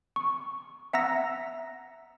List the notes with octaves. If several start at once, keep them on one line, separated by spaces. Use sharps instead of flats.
C#6
E5 F#5 A#5 E6 A#6